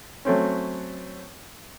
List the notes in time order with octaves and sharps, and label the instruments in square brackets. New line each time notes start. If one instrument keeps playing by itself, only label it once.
[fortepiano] F#3 A3 C4 C#4